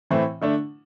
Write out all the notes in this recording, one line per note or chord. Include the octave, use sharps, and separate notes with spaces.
A2 E3 A3 C4
D3 A3 D4